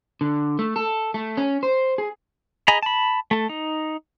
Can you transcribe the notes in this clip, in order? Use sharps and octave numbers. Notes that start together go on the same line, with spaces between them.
D3
A3
A4
A3
C#4
C5
G#4
G#4 D#5 G#5 A#5 B5
A5 B5
A3 A4
D#4